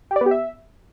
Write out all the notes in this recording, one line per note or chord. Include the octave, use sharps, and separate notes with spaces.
G4
D5
B3
G4
E5